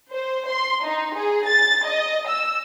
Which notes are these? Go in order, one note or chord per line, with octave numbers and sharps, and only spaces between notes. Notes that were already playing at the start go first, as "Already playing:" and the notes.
C5
C6
D#4
G#4
A6
D#5
E6